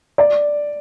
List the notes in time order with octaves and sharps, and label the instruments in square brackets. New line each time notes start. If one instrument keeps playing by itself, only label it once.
[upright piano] D5